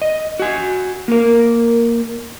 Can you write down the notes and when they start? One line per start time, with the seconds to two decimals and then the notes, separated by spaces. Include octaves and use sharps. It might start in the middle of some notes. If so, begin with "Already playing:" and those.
0.02 D#5
0.39 F#4 G#5
1.08 A#3 A#4